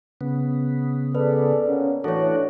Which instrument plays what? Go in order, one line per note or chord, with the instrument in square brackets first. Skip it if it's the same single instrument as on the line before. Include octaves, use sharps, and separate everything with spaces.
[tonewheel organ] C#3 B3
[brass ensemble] G#4 A4 D5 [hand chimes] B4
[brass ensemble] A#3 B3 C#4
[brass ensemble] A2 E3 [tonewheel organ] D4 F#4 [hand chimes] A4 C#5